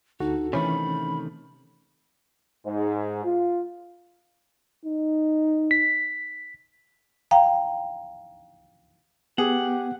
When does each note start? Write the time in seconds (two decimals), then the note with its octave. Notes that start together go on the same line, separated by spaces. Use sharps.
0.20 D2 D#4 F#4 A4
0.53 C3 D#3 E3 A3 C#4 B5
2.66 G#2
3.25 F4
4.86 D#4
5.71 B6
7.31 F5 G5 A#5
9.38 B3 G4 G#4 F#5